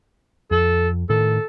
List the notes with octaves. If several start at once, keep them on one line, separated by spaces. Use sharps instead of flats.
F2 A4
A2 D#3 A4